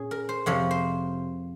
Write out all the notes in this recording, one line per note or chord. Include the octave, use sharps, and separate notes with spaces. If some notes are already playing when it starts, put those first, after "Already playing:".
Already playing: A#2 C#4 G#4
A#4
C5
F2 C3 F3 C#5
C5